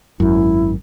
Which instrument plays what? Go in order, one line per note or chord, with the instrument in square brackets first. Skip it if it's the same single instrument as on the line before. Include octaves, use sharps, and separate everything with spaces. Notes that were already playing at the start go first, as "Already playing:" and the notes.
[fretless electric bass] G#1 F#2 [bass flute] E4